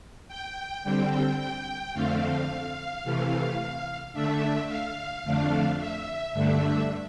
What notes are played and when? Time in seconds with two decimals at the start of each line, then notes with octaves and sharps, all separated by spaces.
0.28 G5
0.83 D3 G3 C4 G5
1.39 G5
1.93 F2 D3 A3 C4 F5
3.04 C3 E3 A3
4.13 D3 A3 D4 E5
4.68 F5
5.24 F2 D3 A3 D4
5.78 E5
6.33 G2 D3 A3 D4 E5